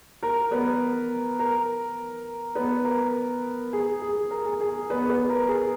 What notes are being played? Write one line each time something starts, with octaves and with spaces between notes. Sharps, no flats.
A#4
B3 B4
A#4
B3 B4
A#4
G#4
G#4
A#4
G#4
G#4
B3 B4
B3 B4
A#4
G#4